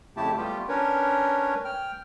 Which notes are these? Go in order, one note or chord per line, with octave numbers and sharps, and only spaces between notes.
F2 C#3 A3 E4 G4 A5
G3 A3 B3 F4 G4
C#4 D4 A#4 B4 C#5
G5 F6